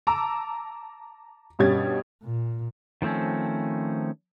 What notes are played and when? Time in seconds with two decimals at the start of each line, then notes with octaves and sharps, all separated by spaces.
0.07 A5 A#5 D6 E6
1.59 G2 B2 G3 C#4 G#6 A6
2.24 A#2
3.02 D#3 F3 A3 C4 C#4